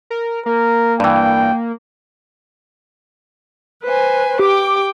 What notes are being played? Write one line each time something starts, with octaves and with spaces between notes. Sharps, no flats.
A#4
A#3 A#4
G2 E3 G5
B4 C5 G#5
G4 G5 D6